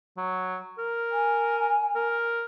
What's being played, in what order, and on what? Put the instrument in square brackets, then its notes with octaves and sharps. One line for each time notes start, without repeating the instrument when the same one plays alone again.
[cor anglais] F#3
A#4
[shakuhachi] G#5
[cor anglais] A#4